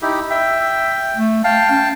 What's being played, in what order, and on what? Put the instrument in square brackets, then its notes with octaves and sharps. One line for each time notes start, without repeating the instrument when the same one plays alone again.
[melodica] D#4 E4 G4
[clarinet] E5 [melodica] G5
[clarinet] A3
[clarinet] F5 [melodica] G5 A5
[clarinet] C#4